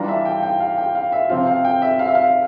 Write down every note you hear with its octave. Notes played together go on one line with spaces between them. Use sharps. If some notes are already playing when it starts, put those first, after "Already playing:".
Already playing: E3 G3 D4 F4 A#5
E5
G5
F5
G5
F5
G5
F5
E5
C3 F3 C4 F4 F5
F5
G5
E5
F5
E5
F5